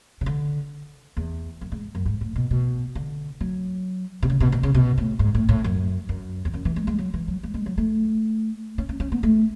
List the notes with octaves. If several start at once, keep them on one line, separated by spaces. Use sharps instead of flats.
C#3
D3
E2
F#2
G#2
F#2
G#2
A2
B2
B2
D3
F#3
B2
C#3
B2
B2
C#3
B2
A2
G#2
A2
A2
F#2
F#2
E2
F#2
E3
G#3
G#3
F#3
E3
F#3
G#3
G#3
F#3
A3
C#4
C#4
C#4
B3
A3